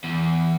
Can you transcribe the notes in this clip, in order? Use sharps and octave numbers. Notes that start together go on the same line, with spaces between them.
E2